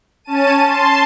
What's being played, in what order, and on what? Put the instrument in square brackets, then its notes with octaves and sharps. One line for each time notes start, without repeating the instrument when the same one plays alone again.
[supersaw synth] C#4 A5 D#7
A5 C6